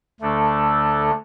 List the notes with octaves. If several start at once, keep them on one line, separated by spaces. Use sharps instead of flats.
D2 D3 A3 D4 A4